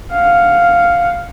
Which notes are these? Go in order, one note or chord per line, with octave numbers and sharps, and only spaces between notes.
F5 F#5